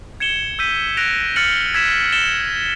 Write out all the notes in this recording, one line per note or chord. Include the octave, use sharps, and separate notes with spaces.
G#6 C#7 E7 G7
E6 G6 B6 D#7
F#6 A#6 D7 F7
F6 A6 C#7 F#7
E6 G#6 B6 E7
A6 C#7 E7 G7